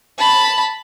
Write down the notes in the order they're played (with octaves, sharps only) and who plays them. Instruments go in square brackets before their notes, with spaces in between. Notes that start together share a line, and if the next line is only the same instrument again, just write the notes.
[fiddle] A5 B5